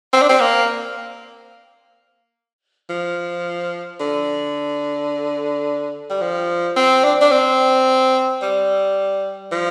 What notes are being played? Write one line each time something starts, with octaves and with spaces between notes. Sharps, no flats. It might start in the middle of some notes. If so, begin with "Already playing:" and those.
C4
D4
C4
A#3
F3
D3
G3
F3
C4
D4
D4
C4
G3
F3